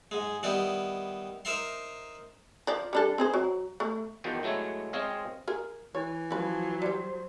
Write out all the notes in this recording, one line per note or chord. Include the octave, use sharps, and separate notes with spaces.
G#2 G#3
D#3 G3 B3 E4 G4
D#4 A#4 C5 E5 A#5 C6
F3 D5
G3 D4 A4
C4 G#4 C5
F#3
A3
E2 D#3 F3 F#4 G5
F#3 G#3 A3 E4 C#5
G#3 C4 C#5 D#5 F5
G#4 A#4
E3 C#5
F3 F#3 C#4 B4
G3 G4 C5